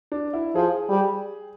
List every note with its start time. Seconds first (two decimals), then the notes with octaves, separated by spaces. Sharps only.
0.12 D4
0.33 E4
0.55 F3 G#4
0.89 G3